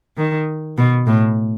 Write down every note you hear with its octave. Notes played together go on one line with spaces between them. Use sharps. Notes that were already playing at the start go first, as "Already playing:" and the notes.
D#3
B2
A2